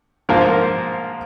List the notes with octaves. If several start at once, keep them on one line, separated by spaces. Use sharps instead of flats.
G#2 F3 A#3 F4 A#4